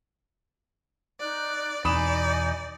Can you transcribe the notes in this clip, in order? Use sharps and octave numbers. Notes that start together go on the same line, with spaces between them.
D#4 D5 F#6
E2 B2 D#4 D5 G#5 B5 D#6 E7